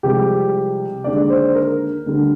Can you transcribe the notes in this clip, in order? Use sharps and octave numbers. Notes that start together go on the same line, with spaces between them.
C2 C3 F3 G#3 G4
D#2 D3 G#3 D5
C5
A#4
D2 D3 G3